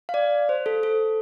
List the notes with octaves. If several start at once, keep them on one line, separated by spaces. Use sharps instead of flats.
F5
D5
C5
A4
A4